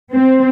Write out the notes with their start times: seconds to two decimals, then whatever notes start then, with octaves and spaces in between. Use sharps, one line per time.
0.14 C4